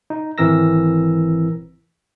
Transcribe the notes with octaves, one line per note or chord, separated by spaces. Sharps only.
D#4
G#1 E3 C4 A#4 E6 A#6